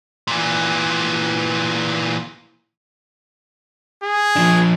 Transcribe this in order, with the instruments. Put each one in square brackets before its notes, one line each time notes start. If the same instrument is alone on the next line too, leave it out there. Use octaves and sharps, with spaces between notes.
[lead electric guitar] A#2 E3
[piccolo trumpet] G#4
[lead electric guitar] F3 D4